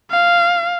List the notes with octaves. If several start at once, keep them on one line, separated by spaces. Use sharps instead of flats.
F5